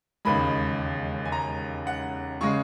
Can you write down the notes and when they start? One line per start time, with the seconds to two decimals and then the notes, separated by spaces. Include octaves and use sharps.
0.25 E1 D#2 C#3 G#3 B5
1.25 G#5
1.32 A#5
1.87 F#5
2.41 C#3 G#3 C#6